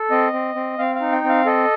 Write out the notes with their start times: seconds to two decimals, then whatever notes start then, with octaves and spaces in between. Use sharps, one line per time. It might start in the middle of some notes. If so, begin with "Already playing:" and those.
Already playing: A4
0.11 C4 D#5
0.33 C4
0.55 C4
0.79 C4 F5
0.95 F5
1.01 D#4
1.12 G5
1.24 C4
1.29 F5
1.46 A4 D#5